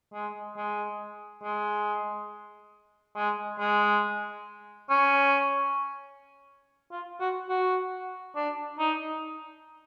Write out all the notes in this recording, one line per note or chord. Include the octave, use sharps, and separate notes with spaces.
G#3
G#3
G#3
G#3
G#3
C#4
F4
F#4
F#4
D4
D#4